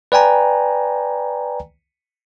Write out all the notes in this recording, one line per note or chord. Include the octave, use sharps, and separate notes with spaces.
B4 D5 G5 G#5 A#5